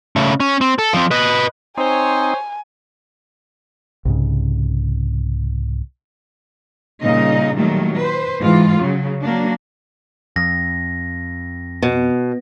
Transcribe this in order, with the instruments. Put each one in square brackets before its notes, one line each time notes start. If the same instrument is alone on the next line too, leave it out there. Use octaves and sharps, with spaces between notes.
[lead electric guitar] C#3 A3
C#4
C4
A4
F3 C4
B4 D#5
[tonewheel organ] C4 D#4 [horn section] C5 C#5 [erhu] G#5
[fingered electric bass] C2 G#2 C#3
[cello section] A#2 C#3 G3 D#4 D#5
A#2 D#3 F#3 G3 A3
B4 C5
G#2 E3 F4
C#3 F#3
F#3 A#3 D4
[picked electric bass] F2 [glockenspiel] A#6
[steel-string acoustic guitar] B2